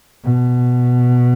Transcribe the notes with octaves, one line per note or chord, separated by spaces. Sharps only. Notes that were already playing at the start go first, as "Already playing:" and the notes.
B2